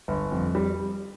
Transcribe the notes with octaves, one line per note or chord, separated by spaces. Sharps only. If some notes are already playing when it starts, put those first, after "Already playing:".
G1
F2
G3